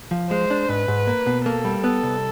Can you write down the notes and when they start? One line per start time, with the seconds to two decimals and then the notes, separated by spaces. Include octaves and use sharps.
0.11 F3
0.31 G#3 C5
0.51 D4
0.69 G#2 B4
0.88 G#2
1.07 A#3
1.26 B2
1.45 A#3 A4
1.65 G3
1.84 B3 A4
2.03 C2